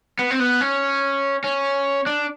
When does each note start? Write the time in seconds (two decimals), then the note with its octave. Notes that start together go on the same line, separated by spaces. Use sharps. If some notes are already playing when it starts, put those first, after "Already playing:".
0.19 B3
0.31 C4
0.40 B3
0.61 C#4
1.44 C#4
2.06 D4